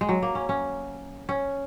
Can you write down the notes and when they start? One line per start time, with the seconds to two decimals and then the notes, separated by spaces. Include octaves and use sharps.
0.01 G#3
0.09 F#3
0.22 A#3
0.35 C#4
0.49 C#4
1.29 C#4